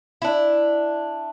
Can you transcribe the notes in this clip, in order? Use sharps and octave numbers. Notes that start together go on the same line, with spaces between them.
D4 E4